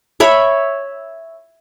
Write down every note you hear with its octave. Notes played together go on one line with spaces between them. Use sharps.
C#5 E5 B5